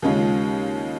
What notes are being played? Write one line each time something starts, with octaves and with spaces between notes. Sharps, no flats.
D#2 C#3 G#3 C#4 F4